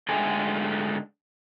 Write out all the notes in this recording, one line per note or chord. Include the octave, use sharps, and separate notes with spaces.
G#2 D3 G#3 A3 G4 G#5